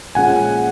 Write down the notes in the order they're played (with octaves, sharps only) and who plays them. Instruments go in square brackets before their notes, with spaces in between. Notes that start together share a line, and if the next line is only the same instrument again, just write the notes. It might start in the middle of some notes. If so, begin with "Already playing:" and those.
[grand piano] A#2 F3 G#3 C#4 [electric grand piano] F#5 G#5